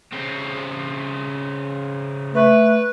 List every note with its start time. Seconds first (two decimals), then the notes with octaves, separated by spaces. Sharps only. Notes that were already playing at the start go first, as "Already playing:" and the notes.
0.13 C#3 C4
2.34 A3 B4